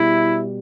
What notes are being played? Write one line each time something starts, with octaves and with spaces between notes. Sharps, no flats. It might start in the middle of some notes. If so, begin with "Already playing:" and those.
Already playing: B2 G3 E4